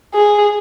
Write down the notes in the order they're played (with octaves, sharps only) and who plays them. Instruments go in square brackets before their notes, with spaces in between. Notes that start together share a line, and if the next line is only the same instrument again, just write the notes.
[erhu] G#4